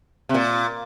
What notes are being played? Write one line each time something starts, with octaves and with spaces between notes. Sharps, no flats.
C3
A#2